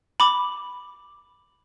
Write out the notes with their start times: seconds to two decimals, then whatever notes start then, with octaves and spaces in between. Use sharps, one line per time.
0.20 B5 D6